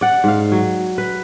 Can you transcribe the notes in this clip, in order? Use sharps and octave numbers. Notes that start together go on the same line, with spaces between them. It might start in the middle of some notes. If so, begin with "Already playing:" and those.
D5 F#5
G#2 F5
F#3
B4